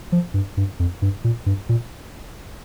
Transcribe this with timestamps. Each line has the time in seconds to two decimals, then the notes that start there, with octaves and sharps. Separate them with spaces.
0.12 F3
0.34 G2
0.57 G2
0.80 F2
1.02 G2
1.24 A#2
1.46 G2
1.69 A#2